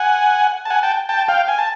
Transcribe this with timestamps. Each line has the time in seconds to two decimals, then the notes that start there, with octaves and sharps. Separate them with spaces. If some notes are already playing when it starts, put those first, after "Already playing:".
Already playing: F#5 G#5
0.65 A5
0.70 F#5 G#5
0.83 G5 A5
1.09 G5 A5
1.28 F5 G5
1.48 G#5
1.58 A5